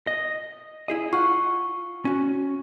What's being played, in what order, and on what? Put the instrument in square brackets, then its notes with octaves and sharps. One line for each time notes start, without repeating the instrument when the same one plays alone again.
[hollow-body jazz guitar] D#5
E4 G#4 D#5
[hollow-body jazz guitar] F4 F#5 [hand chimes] C#6
[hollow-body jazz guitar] C#4 F#4